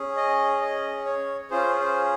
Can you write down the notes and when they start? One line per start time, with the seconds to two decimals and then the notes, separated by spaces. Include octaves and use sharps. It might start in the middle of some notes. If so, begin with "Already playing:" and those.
Already playing: C#4 G#4
0.17 D#5
0.61 D#5
1.06 C#5
1.50 C#4 F4 G#4 C5
1.80 C5